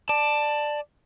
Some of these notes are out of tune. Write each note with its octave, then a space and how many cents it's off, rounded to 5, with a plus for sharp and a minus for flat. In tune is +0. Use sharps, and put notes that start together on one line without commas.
D5 +15 A5 +0